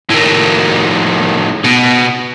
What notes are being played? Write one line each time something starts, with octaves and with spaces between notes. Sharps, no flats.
A2 D#3
B2